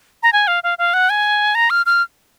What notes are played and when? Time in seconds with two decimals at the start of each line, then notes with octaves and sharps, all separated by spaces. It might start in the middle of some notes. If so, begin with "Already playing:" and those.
0.23 A#5
0.33 G#5
0.48 F5
0.64 F5
0.78 F5
0.94 F#5
1.10 G#5
1.55 A#5
1.70 F6
1.86 F6